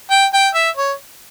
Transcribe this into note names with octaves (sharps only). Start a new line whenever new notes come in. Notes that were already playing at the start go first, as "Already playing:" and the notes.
G5
G5
E5
C#5